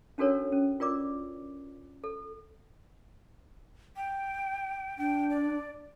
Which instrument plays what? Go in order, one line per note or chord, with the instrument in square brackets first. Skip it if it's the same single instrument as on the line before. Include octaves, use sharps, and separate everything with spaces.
[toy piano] C#4 D4 F#4 A4 A#4 C#5
C#4
F4 A#4 D5 D6
A4
[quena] G5
[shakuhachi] D4 [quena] G5
[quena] D5